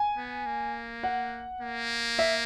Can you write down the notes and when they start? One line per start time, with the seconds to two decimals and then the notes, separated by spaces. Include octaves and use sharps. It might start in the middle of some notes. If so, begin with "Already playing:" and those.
Already playing: G#5
0.17 B3
0.46 A#3
1.03 F#5
1.61 A#3
2.19 E5